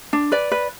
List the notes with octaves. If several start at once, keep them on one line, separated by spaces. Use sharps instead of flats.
D4
B4 D5
B4